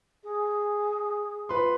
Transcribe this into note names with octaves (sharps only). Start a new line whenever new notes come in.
G#4
F4 B4 C6